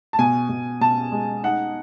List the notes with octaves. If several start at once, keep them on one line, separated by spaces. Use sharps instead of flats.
A5
B2 G#5
B2
B2 A5
G#3
D#4 F#5